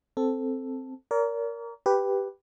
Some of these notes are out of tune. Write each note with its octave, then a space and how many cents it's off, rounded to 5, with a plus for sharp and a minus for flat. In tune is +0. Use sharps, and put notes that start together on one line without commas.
C4 +0 A4 +0
A#4 +0 D5 -45
G4 +0 B4 +0